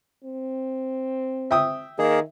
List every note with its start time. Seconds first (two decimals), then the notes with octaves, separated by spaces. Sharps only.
0.24 C4
1.51 E5 G5 D#6
1.99 D#3 A#3 G#4